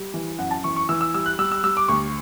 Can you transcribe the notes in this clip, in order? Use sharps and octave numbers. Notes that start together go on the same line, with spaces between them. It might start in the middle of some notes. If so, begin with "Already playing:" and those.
Already playing: G3
E3
F#2 F#5
A5
E3 C#6
C#6
E3 E6
E6
G3 E6
F#6
G3 E6
E6
G3 E6
D6
D2 C#6